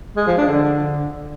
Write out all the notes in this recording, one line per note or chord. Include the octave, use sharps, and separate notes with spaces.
G#3
F3
D4
D3